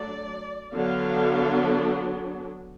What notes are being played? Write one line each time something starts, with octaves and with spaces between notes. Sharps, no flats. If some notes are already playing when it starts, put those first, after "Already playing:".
Already playing: F#3 A3 D4 D5
D3 F#3 B3 D4 F5